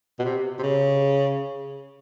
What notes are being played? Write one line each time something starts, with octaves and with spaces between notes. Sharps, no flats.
B2
C3
C3
C#3